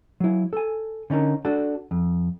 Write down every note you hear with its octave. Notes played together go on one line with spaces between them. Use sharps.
F#3 E4
A4 G#5
D3 C#4 D#4 A#4
D4 F#4 A4
F2